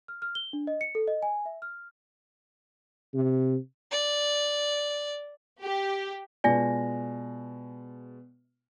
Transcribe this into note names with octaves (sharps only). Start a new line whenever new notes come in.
F6
F6
G7
D4
D#5
C#7
A4
D#5
G#5
E5
F6
C3
D5
G4
B2 G#3 F4 D5 G#5 A#6